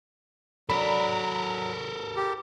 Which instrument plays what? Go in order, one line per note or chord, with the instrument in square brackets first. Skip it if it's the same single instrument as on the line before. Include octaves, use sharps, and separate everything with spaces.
[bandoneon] F#3 [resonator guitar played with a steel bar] D4 [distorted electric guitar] A4 A#4 [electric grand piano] B5
[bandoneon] G4